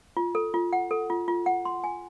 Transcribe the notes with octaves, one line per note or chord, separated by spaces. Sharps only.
F4
A4
F4
F#5
A4
F4
F4
F#5
C6
G#5